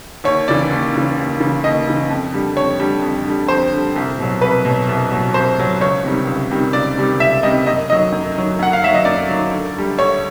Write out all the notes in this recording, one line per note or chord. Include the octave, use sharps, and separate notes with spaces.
D#2 C#5
C#3 E3 D5
D#2
C#3 E3
D#2
C#3 E3
D#2 D#5
C#3 E3
F2
D3 G3
F2 C#5
D3 G3
F2
D3 G3
F2 C5
D3 G3
C2
B2 F#3
C2 B4
B2 F#3
C2
B2 F#3
C2 C5
B2 F#3
C#2 C#5
C3 D#3 G3
C#2
C3 D#3 G3
C#2 D5
C3 D#3 G3
C#2 E5
C3 D#3 G3 D#5
F#2 D#5
D#3 F#3 D#5
F#2
D#3 F#3
F#2 F#5
F5
D#3 F#3 E5
D#5
F#2 D5
D#3 F#3
D2
D3 G3
D2 C#5